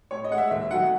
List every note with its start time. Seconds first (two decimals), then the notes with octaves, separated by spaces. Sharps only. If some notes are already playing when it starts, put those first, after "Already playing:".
0.11 A2 C#5
0.24 D#5
0.31 G#3 F#5
0.38 E5
0.51 D#2 E5
0.70 D#3 F#3 A3 F#5